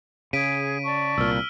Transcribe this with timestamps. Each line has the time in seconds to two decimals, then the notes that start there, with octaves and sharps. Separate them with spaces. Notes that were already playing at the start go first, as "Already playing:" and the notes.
0.33 C#3 G#4 B6 D7 D#7
0.85 D5 A5 C#6
1.18 C2 A#2 E6 F6